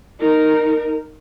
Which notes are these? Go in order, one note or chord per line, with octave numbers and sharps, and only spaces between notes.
D#4 A#4